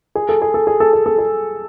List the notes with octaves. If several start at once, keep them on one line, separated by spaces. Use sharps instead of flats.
G#4
A4
G#4
A4
G#4
A4
G#4
A4
G#4